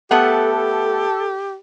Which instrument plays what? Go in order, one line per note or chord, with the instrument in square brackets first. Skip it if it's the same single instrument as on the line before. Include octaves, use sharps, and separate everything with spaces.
[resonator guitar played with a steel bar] A3 B3 F#5 [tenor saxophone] G4 [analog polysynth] A4